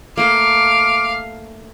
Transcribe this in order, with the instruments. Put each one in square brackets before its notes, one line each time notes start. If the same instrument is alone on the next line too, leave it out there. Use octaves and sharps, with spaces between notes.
[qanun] A3 A#3 [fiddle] F5 [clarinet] D6